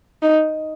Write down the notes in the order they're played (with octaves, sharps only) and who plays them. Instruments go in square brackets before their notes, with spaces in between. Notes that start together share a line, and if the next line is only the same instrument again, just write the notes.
[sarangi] D#4